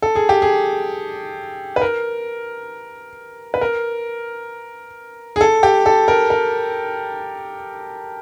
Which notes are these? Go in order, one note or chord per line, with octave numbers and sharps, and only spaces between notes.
A4
G#4
G4
G#4
B4
A#4
B4
A#4
G#4
A4
G4
A4
A#4
A#4